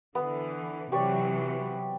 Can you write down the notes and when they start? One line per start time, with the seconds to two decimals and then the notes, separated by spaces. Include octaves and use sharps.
0.15 D3 E3 B3
0.92 C3 E3 F#3 G4 C#5 D5